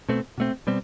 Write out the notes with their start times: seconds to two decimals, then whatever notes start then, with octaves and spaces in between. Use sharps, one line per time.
0.08 B2 A3 C4
0.38 B2 A3 C4
0.67 B2 G3 C4